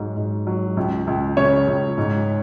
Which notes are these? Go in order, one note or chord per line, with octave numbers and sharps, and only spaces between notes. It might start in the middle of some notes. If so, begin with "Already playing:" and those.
Already playing: G#2 F#3
G#2
F#3
C#2
C#2
C#3 C#5
C#2
G#2